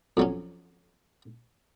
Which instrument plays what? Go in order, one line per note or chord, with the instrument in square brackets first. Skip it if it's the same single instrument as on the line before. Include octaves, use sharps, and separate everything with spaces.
[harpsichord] F2 F#3 C#4